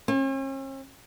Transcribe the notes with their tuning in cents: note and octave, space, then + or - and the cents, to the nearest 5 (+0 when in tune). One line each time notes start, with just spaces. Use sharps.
C#4 -45